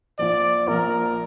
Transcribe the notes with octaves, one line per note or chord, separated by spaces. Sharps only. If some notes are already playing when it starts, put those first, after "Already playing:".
A#1 A#2 F3 D5
A#1 A#2 F3 A#4